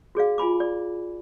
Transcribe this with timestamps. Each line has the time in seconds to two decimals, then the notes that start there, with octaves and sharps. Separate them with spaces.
0.15 F#4 G#4 D5 F5
0.38 F4 G#5 B5 D6
0.60 D5